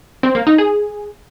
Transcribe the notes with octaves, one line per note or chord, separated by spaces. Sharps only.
C4
A#3
D#4
G#4